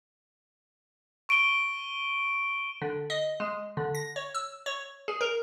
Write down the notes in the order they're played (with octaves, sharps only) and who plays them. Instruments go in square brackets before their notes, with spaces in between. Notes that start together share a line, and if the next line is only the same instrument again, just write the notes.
[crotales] C#6 D7 D#7 G7
[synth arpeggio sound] D3
D#5
G#3
D3
A#6
C#5
E6
C#5
G#4
A#4